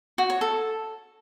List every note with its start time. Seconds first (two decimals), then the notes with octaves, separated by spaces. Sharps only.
0.18 F#4
0.30 C#5
0.41 A4